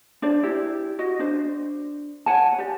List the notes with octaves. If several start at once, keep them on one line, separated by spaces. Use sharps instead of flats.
D4 C5 D5
E4 G4
F#4 D#5
D4 C5
C#5 F#5 G#5 A5
G4 D5